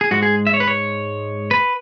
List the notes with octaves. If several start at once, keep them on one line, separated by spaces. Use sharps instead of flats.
G#4
G#2 G#3 F#4
G#4
E5
C#5
B4
C#5
B4